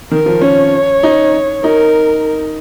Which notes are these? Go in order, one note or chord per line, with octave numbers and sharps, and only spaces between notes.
D#3 A#4
F3
C#4 C#5
D#4
D#4 A#4